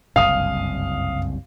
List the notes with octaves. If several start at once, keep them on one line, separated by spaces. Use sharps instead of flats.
F#1 C2 G2 F5 D#6